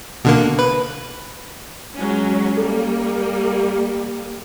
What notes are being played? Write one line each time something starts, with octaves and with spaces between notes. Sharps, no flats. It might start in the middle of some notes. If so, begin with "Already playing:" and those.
B2 D3 A#3
B4
F#3 G#3 C#4
G3 A#3 A4